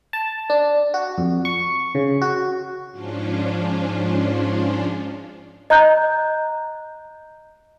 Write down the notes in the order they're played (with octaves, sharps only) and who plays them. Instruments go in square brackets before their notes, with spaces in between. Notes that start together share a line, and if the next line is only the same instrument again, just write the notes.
[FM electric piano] A5
D4
F#4
F2
C#6
C#3
F#4
[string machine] G#2 F3 C#4 D4 F4
[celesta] D#5 A#5 F#6 G6